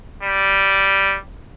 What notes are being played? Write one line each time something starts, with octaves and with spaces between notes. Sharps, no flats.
G3